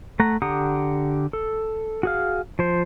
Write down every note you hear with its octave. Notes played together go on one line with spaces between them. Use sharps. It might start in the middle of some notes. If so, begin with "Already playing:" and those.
A3 F#5 A#5
D3 G4 F#5 A#5 D#6
A4
F#4 G#4 F5
F3 C5